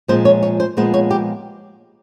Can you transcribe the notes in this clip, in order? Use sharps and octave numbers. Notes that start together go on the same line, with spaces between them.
A#2 F3 G#3 C4 C5
C#5
C#5
C5
A#2 F3 G#3 B3 C5
C#5
G4